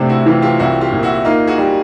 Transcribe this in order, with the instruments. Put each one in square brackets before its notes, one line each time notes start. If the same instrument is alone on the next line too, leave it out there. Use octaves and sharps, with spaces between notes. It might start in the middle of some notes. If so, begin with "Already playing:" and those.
Already playing: [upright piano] A2 C3 [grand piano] C4 D4
[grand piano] E4 F#4
[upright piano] E3 [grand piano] F4 G4
[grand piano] F4 G4
[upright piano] C2 [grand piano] E4 F#4
[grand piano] F4 G4
[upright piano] A#2
[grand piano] E4 F#4
[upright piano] A#3 [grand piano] D#4 F4
[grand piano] F#4 G#4
[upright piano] G3